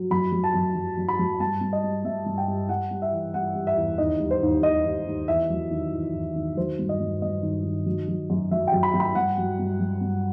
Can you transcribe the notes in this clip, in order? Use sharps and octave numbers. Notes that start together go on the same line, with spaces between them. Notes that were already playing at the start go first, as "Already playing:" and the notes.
Already playing: F#3
F#2 B5
F#3
A5
F#2
F#2
F#2
B5
F#3
G2 A5
G2
D#5
G3
G2 E5
G2
G5
G3
G3 F#5
G3
E5
E3
G3 F#5
G3
E5
E2
D#2 D#5
G3
C5
D#2
D#2 D#5
D#2
D#2
E2 E5
F#3
D#3
E2
E2
D#3
F#3 C5
G2
D#5
G2
G2 D#5
D#3
D#3
F#3
F#3
F#2
F#3 E5
G5
F#2
B5
F#2
B5
G2 F#5
F#3
G2
F#3
G2